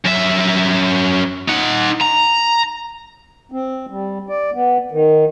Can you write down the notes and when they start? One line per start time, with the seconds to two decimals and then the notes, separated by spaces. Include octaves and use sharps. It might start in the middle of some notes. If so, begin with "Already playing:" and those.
0.05 F#2 E5
1.48 D#4 F#5
2.01 A#5
3.52 C4
3.90 G3
4.29 D5
4.54 B3
4.92 D#3